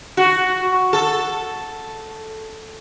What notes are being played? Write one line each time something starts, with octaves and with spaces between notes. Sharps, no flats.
F#4
A4